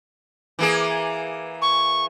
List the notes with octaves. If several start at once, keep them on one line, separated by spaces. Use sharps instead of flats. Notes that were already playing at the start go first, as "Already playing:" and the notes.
E3 A#3 G#4
C#6